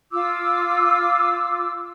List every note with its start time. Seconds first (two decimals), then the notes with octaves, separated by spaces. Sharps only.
0.12 F4 D6 E6